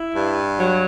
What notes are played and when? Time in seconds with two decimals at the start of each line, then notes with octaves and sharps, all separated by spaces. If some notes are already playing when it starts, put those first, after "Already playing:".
Already playing: E4
0.15 G2
0.60 F#3